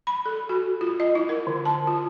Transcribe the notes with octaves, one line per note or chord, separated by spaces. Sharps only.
B5
A4
F#4
F4
D#5
E4
A#4
D3
A5
F4